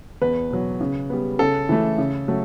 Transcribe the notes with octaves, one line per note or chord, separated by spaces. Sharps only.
E2 B4
B2 F#3
C#3
G3 B3
C#3 A4
E3 A3
C#3
F#3 A3